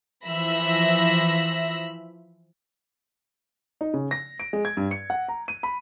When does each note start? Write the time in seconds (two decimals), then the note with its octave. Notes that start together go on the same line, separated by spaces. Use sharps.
0.24 E3 F3 E5 B5 E6 A#6
3.81 D#4
3.94 C#3
4.11 A#6
4.40 D7
4.53 G#3
4.65 G#6
4.77 G2
4.91 C#7
5.10 F#5
5.28 A#5
5.48 D#7
5.63 B5